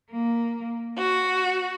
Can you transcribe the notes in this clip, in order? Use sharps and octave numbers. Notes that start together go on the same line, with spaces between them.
A#3
F#4